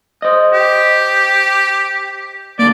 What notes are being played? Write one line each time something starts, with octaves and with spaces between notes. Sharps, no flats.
C5 D#5
G4
D3 A#3 D5